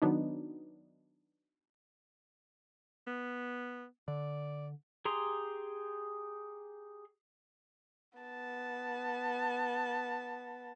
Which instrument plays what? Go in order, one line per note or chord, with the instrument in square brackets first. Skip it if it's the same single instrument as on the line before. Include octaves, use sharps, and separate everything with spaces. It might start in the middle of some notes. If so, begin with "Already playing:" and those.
[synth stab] D#3 F#3 B3 D4 D#4
[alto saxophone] B3
[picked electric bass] D3 [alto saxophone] D5
[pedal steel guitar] G4 G#4 A#5 C6
[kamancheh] B3 A5